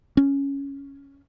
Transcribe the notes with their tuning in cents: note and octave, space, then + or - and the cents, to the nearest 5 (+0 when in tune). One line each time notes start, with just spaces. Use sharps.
C#4 +5